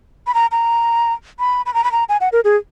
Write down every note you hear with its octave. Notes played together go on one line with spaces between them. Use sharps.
B5
A#5
A#5
B5
B5
A#5
B5
A#5
G#5
F#5
A#4
G#4